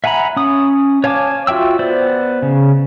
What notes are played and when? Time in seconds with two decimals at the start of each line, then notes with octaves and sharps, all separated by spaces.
0.04 E5 F#5 G#5 A#5 B5
0.37 C#4 D#6
1.04 C#5 F5 G#5 A5 D6
1.47 F4 F#4 E5 G5 E6
1.79 B3 C5 D5
2.42 C#3